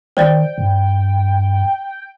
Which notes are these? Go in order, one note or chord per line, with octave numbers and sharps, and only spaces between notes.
D#3 C5 D5 G5 A6
G2